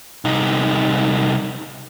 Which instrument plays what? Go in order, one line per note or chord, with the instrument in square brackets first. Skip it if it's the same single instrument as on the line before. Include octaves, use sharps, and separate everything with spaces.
[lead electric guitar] C2 D#4